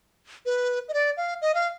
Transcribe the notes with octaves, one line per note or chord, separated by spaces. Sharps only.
B4
D#5
D5
F5
D#5
F5